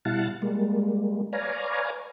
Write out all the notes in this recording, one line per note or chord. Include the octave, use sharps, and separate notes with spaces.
B2 G3 E4 F5 F#5 A5
G3 G#3 A#3
B4 C#5 D5 F5 G#5 A#5